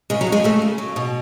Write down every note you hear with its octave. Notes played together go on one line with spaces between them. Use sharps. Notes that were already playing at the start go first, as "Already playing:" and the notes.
C#3 G#3
F#3
C#3
G#3
C#3 F#3 A3
C#3
F#3
B2